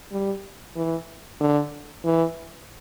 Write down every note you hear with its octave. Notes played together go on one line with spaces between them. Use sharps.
G3
E3
D3
E3